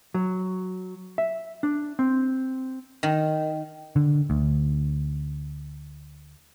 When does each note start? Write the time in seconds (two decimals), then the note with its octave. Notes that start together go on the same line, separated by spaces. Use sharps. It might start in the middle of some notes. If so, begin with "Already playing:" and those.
0.14 F#3
1.18 E5
1.63 D4
1.99 C4
3.03 D#3
3.96 D3
4.30 D2